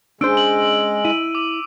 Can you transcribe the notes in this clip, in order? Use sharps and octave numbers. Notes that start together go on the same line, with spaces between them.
G#3 C#4 D4 C5 E6 D7
F#7
E4 D#7
D6